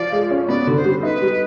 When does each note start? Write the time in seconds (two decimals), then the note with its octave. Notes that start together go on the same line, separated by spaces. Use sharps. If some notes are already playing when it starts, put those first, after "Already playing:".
Already playing: F3 F4 D5
0.12 G#3
0.31 C#4
0.48 B3 D5
0.67 D3
0.76 C5
0.85 G3
1.03 D#4 B4
1.22 G3